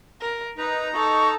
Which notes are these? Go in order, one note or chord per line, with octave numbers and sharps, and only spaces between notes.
A#4
D#4 B4 A#5
A4 C#6